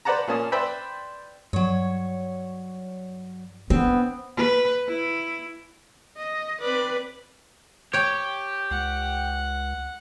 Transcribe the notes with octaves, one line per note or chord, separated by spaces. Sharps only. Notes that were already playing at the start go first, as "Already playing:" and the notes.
B4 C5 D5 F#5 A5 A#5
A#2 A#3 C#4 A5 D#6
B4 C5 D5 E5 G5 B5
G2 F#3 C#5
B3 C4 D4
B4
E4
D#5
C4 B4 D5
G4 C#5 G5
C#2 F#5